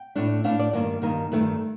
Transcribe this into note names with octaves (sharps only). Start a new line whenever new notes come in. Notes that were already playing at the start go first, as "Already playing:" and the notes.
Already playing: G5
A2 A3 D4
A2 A3 D4 F5
D5
G2 D#3 A#3 D#4
G2 D#3 A#3 D#4
G2 D#3 A3